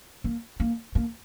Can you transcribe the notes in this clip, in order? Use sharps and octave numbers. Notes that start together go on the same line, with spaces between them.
A#3
A#3
A#3